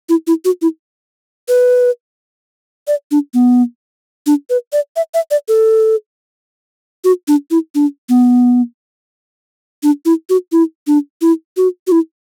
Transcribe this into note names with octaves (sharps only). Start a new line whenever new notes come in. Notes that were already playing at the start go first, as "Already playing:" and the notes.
E4
E4
F#4
E4
B4
D5
D4
B3
D4
B4
D5
E5
E5
D5
A4
F#4
D4
E4
D4
B3
D4
E4
F#4
E4
D4
E4
F#4
F#4
E4